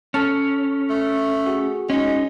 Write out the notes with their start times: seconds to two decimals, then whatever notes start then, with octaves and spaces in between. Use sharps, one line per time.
0.14 C#4 A4 A5 F6
0.90 A3
1.47 F#4 G#4
1.90 G#3 C#4 D#4